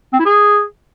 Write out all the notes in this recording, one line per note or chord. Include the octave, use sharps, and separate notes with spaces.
C4
E4
G#4